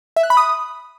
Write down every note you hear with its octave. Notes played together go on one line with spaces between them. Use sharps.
E5
F#6
B5
D#6